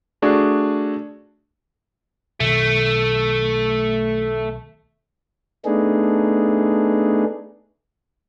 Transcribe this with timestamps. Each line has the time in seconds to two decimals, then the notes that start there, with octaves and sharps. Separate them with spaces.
0.22 A3 D4 F#4 G#4
2.40 B1 D#3 A3
5.65 A3 B3 D4 D#4 G#4